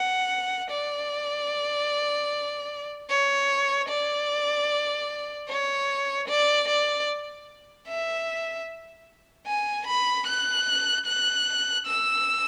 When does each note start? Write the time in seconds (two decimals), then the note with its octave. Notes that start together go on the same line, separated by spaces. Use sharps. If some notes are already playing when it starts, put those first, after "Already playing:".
Already playing: F#5
0.71 D5
3.10 C#5
3.89 D5
5.49 C#5
6.28 D5
6.68 D5
7.87 E5
9.46 G#5
9.87 B5
10.27 F#6
11.06 F#6
11.86 E6